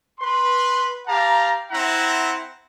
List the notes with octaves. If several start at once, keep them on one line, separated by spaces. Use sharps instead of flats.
B4 C6
G4 F5 A5 A#5
C4 E4 E5 F#5 A#5